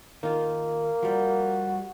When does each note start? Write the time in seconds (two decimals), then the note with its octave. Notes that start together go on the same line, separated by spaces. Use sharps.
0.23 D#3 A#3 F4
1.03 F3 G3 F#4